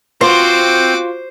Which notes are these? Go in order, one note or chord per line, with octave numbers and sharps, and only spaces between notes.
C4 F4 F#4 C5 D6